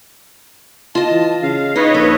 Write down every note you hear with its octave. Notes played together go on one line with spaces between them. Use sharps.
F4 D#5 A5
E3
C#3 F5
D#4 B4 C#5 D#5
A#1 A4